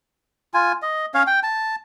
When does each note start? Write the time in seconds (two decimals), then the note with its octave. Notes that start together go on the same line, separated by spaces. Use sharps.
0.54 F4 G#5
0.82 D#5
1.14 C#4 C#5 F5
1.27 G5
1.43 A5